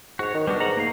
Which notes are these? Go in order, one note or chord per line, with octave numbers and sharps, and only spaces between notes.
G#2 F#4 C#5
D#3
G3 B3 D4 F#4
G#2 F#4 F#5 A#5
A#3 D#4 F5